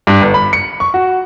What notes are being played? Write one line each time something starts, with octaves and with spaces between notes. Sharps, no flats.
G2
G1
B5
C#7
C#6
F#4